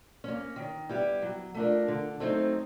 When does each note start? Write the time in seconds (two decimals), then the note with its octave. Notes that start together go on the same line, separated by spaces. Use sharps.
0.24 A#3 C#4
0.56 D#3
0.89 G3 B3 E4 G4
1.22 F#3
1.55 A3 D4 F4 A#4
1.88 D3
2.20 F#3 A3 C4 D#4